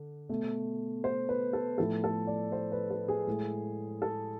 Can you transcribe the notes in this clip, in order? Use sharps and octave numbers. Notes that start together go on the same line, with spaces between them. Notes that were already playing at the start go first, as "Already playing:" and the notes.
Already playing: D3
B2 A3
C5
B4
A4
A2 F3 A3 A4
A4
D5
C5
B4
A4
G#4
A2 G#3
A4